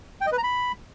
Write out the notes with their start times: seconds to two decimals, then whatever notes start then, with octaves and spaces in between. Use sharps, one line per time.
0.21 G5
0.26 D#5
0.32 B4
0.38 A#5
0.43 B5